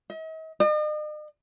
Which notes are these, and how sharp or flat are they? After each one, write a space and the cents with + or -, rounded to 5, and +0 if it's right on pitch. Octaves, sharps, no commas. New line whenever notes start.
D#5 +45
D#5 -45